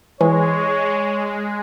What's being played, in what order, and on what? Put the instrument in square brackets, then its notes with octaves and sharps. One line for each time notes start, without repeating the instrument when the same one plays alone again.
[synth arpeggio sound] E3 [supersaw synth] G#3 [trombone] C#5